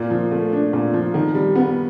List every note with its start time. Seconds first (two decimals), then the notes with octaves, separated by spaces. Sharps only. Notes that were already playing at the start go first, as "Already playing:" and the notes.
Already playing: A#2 A#3
0.10 F3
0.31 A3
0.52 D4
0.73 A#2
0.94 F3
1.14 D#3
1.35 G3
1.55 B3